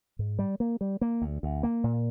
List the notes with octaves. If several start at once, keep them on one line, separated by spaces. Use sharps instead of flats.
G#2
G3
A#3
G3
A#3
D2
D2
A#3
A#2